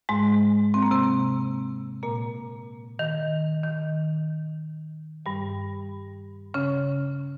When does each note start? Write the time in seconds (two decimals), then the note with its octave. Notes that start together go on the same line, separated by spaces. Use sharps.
0.09 G#2 G#3
0.74 C4
0.83 A#3
0.91 C3 C4
2.03 A#2 A#3
2.99 D#3
3.64 D#3
5.26 G2 G3
6.54 C#3 C#4